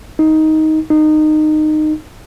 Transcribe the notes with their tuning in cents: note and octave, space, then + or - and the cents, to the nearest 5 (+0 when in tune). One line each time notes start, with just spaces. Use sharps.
D#4 +10
D#4 -20